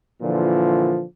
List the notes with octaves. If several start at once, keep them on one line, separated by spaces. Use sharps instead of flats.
A#2 D3 E3 F3